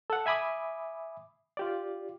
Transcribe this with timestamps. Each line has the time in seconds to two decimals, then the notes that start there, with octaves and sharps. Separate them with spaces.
0.10 A4 F#5
0.26 E5 G#5 B5 D6 D#6
1.57 F4 G4 D5